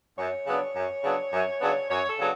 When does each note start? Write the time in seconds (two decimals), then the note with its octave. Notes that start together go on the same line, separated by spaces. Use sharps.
0.18 F#2 C#5
0.46 C#3 F#3 B3 D4
0.76 F#2
1.04 C#3 F#3 B3 D4
1.33 F#2
1.61 C#3 F#3 B3 D4
1.90 F#2 C#5
2.08 A4
2.19 C#3 F#3 B3 D4